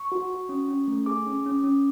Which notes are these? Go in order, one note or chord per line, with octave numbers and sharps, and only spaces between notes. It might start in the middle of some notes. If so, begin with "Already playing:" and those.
Already playing: C#6
F#4
F#4
C#4
C#4
A3
G#4 D6
C#4
C#4
C#4